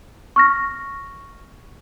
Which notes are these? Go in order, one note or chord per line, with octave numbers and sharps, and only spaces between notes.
C#6 F6 A#6